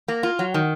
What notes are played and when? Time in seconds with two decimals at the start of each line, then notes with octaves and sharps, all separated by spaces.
0.08 A#3
0.23 F4
0.39 F#3
0.54 D#3